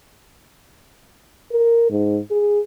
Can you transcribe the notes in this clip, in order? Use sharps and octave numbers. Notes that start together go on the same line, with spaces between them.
A#4
G#2
G#4